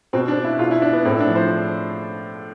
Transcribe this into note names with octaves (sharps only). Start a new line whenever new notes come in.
B2 C4
D4
E4
B2 F4
E4
D4
B3
A2 C4
E4
D4
F3
C5